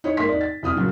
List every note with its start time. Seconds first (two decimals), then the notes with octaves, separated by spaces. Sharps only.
0.04 D#4 E4 C#5
0.17 G#2 A#3 E5 C6 B6
0.29 D#4 D5
0.41 A6
0.63 C2 E4 D#6 F6
0.76 A#2 C#3 F#3 F#4